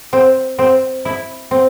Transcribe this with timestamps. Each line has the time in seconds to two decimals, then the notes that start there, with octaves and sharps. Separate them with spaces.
0.13 C4
0.59 C4
1.05 E4
1.51 C4